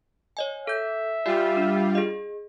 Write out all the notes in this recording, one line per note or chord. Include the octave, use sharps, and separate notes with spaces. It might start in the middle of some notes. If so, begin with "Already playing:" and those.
C#5 D#5 G#5
A4 E5 G6
G3 F4 G4 D5 G#5
D4
G#4 D#5